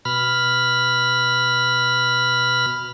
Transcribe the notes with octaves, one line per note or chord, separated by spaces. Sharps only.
B2 B5 F6